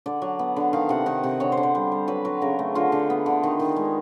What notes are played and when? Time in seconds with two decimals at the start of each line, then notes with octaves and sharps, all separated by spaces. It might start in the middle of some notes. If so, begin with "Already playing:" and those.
0.06 D3 D5
0.22 F#3
0.39 B3
0.56 D3
0.73 D#3 F5
0.89 C3 F#5
1.06 D#3 F#5
1.24 C3
1.40 D3 C#5
1.52 C5
1.57 D3
1.63 C5
1.75 G3
1.92 G3
2.08 F#3 B4
2.25 F#3 B4
2.41 C#3 A#4
2.59 A3
2.75 D3 F4
2.92 D3
3.10 B3
3.26 D3
3.43 D#3
3.60 D#3
3.76 G#3